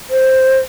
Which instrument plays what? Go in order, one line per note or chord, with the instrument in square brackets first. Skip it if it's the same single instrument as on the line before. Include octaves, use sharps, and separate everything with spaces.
[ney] C5